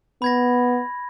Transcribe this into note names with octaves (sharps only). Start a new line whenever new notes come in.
B3 B5 G#6 A#6